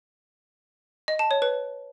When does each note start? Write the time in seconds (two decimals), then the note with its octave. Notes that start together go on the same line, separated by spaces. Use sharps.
1.08 D#5
1.19 A5
1.31 C#5
1.42 B4